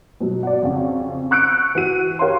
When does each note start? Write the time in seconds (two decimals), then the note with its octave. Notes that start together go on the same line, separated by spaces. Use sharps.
0.20 B2 F#3
0.43 D5 F#5
0.62 F2 C#3
1.31 C#6 E6 F#6 G6 C#7 D7
1.75 E3 F#4 D#7
2.19 G4 A#4 C#5 F5 F#5 C6